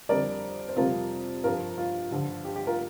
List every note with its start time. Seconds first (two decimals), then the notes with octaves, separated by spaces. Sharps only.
0.09 F2 D3 G3 A#4 D5
0.69 C5
0.76 F2 C3 G3 F4 A#4
1.44 G2 F3 F4 A#4
1.78 F4
2.11 G2 D3 F3
2.45 G4
2.56 G4
2.67 F4 A#4